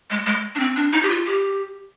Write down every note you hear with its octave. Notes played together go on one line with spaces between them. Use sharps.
G#3
G#3
D4
C4
D4
D#4
G4
F4
G4